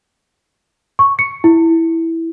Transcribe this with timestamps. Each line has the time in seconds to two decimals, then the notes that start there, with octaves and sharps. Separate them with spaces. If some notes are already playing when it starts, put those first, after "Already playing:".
0.99 C#6
1.19 C#7
1.44 E4